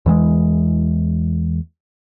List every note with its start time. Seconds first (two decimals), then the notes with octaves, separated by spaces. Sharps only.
0.06 E2 E3 G3 G#3